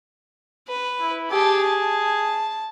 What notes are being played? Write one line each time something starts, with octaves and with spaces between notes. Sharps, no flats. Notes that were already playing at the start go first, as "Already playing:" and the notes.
B4
E4
G4 G#4 A5
A5